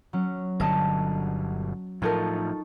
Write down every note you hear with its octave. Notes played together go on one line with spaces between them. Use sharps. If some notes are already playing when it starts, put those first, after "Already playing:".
F#3 C#4
G1 B2 D3 D#5 A5
A2 F3 D#4 F4 A4 A#4 C#6